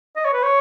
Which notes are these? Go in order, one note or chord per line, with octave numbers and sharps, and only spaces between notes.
D#5
C#5
B4
C#5